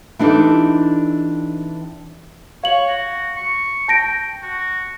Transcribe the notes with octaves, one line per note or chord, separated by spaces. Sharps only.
E3 C4 D4 D#4 G4 A4
C#5 F5 F#7
F#4
C#6
G5 A5 A#6 D7
F#4